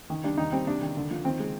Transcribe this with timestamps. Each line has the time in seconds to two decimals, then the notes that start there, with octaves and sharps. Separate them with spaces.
0.10 D#3
0.24 G3 D4
0.37 D#3 D#4
0.52 G3 C4
0.67 C3 D4
0.82 D#3
0.97 D3
1.11 F3
1.24 D#3 C4
1.40 G#3